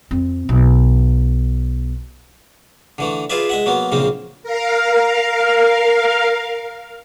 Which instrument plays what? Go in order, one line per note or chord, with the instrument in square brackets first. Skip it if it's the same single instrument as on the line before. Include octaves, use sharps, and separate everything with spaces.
[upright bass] F2 C4
B1
[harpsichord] D3 E3 A3
F4 G#4 B4 D5 E5
G#3 E5 F#5
F#3 A#3 B3
A#1 C#3 A#3 C4
[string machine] A#4 F5